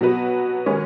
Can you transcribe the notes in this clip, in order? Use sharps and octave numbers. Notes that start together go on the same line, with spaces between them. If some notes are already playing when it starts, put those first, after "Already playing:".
B2 F#3 B3 F#4 B4
D#3 G#3 C#4 B4